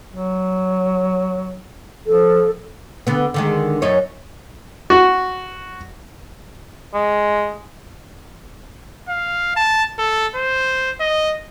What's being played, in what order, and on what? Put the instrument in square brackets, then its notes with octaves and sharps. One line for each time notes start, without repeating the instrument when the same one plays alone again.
[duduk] F#3
[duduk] F3 [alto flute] A4
[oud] D3 B3
D3 D#3 G#3
F#2 D#4 C#5
[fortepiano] F#4
[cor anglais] G#3
[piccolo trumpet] F5
A5
A4
C5
D#5